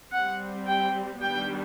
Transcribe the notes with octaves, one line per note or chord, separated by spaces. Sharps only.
G3 C4 F#5
G5
D#3 G3 B3 D4 G5